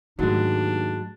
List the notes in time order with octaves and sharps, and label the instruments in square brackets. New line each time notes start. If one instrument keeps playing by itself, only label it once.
[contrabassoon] D#2 [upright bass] G#2 A3 [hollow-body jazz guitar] F#3 G#3 [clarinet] D4